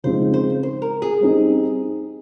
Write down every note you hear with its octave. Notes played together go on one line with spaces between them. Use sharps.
C#3 F3 G#3 C4 D#4 C5
C5
C5
A#4
G#4
G3 C4 D#4